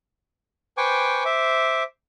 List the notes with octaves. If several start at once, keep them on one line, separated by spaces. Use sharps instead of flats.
B4 C5 G5 G#5 C#6 D6
C5 E5 D6